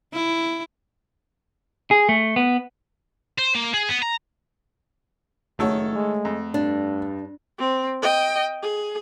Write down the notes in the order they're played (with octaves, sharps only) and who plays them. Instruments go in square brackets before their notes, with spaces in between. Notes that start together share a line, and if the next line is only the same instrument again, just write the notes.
[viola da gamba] E4
[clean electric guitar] G#4
A3
B3
[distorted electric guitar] C5
A#3
G#4
B3
A#5
[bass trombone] F#1 [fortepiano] D#3 A4 C#5 [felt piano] A3 G#4 F#5
[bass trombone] G#3
[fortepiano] F2
[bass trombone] G2 [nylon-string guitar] D4
[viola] C4
D#5 G5
G#4